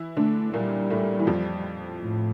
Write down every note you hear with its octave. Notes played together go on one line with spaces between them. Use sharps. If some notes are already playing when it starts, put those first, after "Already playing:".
Already playing: E3 E4
D3 A3 D4
A#2 G3 A#3
A2 A3
E3
F2 F3
A2